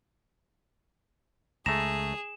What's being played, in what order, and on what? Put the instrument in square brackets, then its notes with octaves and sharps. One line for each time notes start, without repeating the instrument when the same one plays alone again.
[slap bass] C#2 [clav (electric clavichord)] A3 A#5 [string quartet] G#4 [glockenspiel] E7